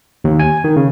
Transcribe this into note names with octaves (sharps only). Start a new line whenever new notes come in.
D#2
G#5
D#3
C#3